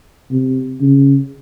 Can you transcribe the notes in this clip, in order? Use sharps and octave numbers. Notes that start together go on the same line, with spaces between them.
C3
C#3